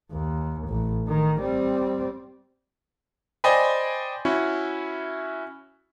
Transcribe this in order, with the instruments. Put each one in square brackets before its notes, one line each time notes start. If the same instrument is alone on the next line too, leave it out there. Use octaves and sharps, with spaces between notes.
[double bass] D#2
A1
D#3
G3 C4
[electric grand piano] C5 D5 D#5 G5 G#5 B5
C#4 E4 F#4